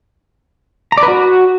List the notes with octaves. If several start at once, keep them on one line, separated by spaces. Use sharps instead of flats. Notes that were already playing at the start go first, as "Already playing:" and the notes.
A#5
D5
B4
F#4